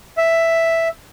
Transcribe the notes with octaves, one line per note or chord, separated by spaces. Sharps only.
E5